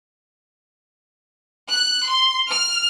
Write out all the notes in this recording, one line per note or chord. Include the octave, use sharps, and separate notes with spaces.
F#6
C6
F6